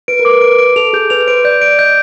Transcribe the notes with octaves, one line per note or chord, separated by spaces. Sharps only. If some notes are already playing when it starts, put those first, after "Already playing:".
B4 D7
A#4
D6
B4
D7
D7
A4 F7
G#4 G6
B4 F7
C5 D7
D5 G6
D7
D#5 G6